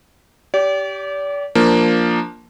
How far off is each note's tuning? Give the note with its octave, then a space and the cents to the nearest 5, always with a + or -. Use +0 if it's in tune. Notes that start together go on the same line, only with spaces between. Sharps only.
G4 -5 D5 -40
F3 +0 A#3 +0 D4 +0